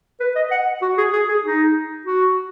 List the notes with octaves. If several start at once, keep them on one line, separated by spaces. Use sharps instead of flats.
B4
D#5
F#5
F#4
G#4
G#4
G#4
D#4
F#4